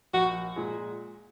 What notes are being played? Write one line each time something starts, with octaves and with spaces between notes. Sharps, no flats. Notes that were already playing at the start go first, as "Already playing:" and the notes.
A#1 F#4
A#2 G#3